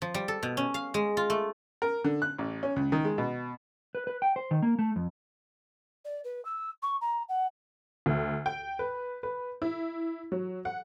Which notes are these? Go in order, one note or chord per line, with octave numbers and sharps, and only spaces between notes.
F3
G3
A4
B2
C#4
F5
G#3
F4
A3
A#4
D3
F#6
A1
C#4
C#2
D#3
G#3
B2
B4
B4
G5
C5
D#3
A#3
A3
F2
D5
B4
E6
C#6
A#5
F#5
D2
G5
B4
B4
E4
F#3
F#5